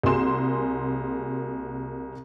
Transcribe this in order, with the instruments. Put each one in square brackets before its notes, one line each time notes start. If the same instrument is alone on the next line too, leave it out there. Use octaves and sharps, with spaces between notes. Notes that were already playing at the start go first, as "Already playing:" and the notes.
[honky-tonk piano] C2 A#3 F#4 G#4 C6 E7